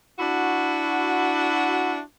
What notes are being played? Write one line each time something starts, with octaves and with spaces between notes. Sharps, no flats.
D4 E4 F#4